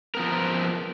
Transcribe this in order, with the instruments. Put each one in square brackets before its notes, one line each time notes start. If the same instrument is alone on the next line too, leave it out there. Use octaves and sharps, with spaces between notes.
[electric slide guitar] F3 B3 A#4